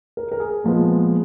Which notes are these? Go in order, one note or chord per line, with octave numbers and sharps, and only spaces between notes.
A#4
A#4
G#4
A#2 F3 G#3 B3